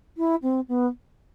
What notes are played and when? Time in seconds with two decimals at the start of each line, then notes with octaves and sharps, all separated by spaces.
0.17 E4
0.42 C4
0.68 B3